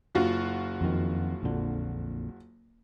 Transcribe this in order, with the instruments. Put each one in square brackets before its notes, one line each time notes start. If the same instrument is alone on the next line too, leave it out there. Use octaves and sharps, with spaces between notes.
[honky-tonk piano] F#1 F4 F#4
[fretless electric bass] F2 D#3
A#1 F2 D3